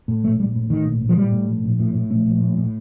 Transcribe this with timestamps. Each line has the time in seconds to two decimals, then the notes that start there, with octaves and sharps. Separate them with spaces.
0.08 A2
0.24 A#1 A3
0.39 A#1 G3
0.55 A2
0.70 A2 D#3
0.85 A#1
1.01 A#1
1.09 F3
1.17 A2 G3
1.32 A2
1.48 A#1
1.64 A#1
1.80 A2
1.95 A2
2.10 A#1 A3
2.26 A#1
2.41 A2
2.57 A2